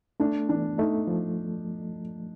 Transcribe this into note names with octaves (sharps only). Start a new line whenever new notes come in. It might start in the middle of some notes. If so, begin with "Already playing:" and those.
A3 D4
E3 D4
A3 D#4
F3